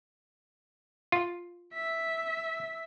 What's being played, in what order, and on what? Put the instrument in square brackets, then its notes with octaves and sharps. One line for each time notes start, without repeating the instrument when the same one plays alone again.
[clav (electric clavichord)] F4
[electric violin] E5 B6